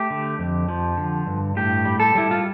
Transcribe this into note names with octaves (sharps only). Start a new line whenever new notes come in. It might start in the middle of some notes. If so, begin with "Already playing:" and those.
Already playing: A3 G4
D3
F2
F3
D3
G2
A2 G4
G3
A4
G3 E4
F4